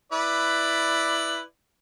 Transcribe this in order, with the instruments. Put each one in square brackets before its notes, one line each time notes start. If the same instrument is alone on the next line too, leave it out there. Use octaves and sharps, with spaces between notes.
[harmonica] E4 B4 D5